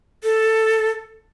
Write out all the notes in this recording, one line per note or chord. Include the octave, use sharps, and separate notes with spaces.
A4